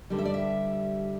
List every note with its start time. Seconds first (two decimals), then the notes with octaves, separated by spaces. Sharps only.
0.10 G2 D3 G3
0.18 E5
0.25 D5
0.34 E5